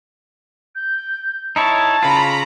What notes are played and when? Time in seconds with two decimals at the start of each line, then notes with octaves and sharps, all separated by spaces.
0.75 G6
1.56 D#4 E4 C#5 A5
2.03 C#3 F4 A#5 B5